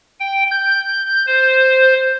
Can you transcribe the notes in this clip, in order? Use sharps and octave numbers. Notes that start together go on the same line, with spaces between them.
G5
G6
C5